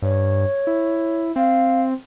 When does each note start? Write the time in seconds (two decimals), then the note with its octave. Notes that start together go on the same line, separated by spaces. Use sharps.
0.02 G2 C#5
0.67 E4
1.36 C4 F5